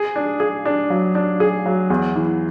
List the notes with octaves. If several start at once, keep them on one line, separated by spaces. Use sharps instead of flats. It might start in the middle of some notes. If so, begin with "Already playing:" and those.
Already playing: G#4
D4
G#4
D4
F#3
D4
G#4
F#3
E2
E3